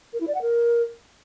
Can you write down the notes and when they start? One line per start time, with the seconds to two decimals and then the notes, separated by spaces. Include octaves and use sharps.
0.13 A#4
0.20 E4
0.28 D5
0.35 F#5
0.42 A#4